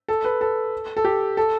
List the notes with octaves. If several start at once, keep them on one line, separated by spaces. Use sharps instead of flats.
A4
B4
A4
A4
G4
A4